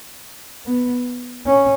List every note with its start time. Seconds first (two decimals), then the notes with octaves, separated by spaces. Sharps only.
0.66 B3
1.46 C#4